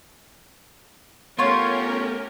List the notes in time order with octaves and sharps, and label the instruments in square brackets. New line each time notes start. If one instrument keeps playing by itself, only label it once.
[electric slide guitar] A3 B3 [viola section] C#4 G4 A#4 [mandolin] F4 C#5